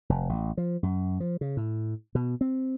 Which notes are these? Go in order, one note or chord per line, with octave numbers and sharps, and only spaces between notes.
F1
A1
F3
F#2
F3
C#3
A2
B2
C4